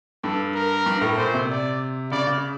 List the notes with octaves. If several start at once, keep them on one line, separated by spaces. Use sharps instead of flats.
G2 A4
A#4
G2
A2
A#2 C5
C3
D5
C#3 D5
C#3